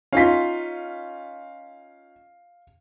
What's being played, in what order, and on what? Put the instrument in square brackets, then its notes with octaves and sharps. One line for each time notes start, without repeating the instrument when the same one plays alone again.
[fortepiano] C#4 D#4 F4 [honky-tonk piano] F5 B6